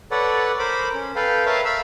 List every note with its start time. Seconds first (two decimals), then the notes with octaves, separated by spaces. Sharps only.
0.11 A4 B4 C#5 D5 F#5
0.59 A#4 C5 B5 D6
0.94 C#4
1.15 A4 B4 F5 G5
1.46 A#4 B4 C#5 E5 F5 A5
1.65 E5 F5 B5 E6